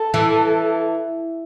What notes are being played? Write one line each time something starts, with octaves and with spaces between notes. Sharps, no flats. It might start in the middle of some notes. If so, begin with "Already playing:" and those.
Already playing: A4
E3